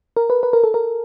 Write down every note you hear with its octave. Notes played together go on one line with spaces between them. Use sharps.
A#4
B4
B4
A#4
A4
A#4